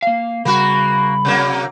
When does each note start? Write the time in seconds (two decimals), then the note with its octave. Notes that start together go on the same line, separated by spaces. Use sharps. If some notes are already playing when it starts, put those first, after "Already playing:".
0.03 A#3 F5
0.45 C#3 G3 A#3 F#4 B5
1.25 C3 F#3 A#3